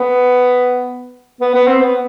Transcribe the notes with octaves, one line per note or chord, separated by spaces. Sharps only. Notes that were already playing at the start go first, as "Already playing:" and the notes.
Already playing: B3
B3
B3
C4
B3